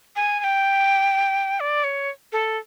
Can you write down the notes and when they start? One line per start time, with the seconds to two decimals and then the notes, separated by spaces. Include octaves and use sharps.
0.16 G#5
0.40 G#5
0.44 G5
1.60 D5
1.84 C#5
2.32 A4